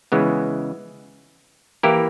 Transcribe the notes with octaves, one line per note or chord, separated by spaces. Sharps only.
C#3 E3 G#3 B3
E3 A#3 E4 G4 A#4